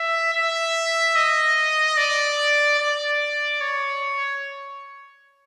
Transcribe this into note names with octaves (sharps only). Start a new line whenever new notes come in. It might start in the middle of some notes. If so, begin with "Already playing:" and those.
Already playing: E5
E5
D#5
D5
D5
C#5